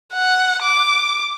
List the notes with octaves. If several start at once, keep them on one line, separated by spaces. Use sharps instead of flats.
F#5
D6